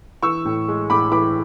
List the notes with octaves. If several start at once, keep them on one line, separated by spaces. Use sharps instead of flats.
E3 C#6 E6
A2
G#3
A2 B5 D6
E3 B5 D6